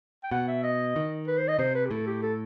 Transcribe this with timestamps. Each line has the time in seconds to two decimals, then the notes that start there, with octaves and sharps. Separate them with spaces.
0.24 G5
0.31 B2 F#5
0.48 E5
0.63 D#5
0.96 D#3
1.27 B4
1.38 C5
1.48 D#5
1.59 C3 C5
1.75 B4
1.86 G4
1.91 A2 A4
2.07 G4
2.23 A4